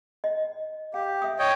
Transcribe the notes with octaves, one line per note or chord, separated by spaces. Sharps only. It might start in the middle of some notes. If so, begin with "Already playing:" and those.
D#5
G4 F5
E5 D#6
C#5 D#5 G5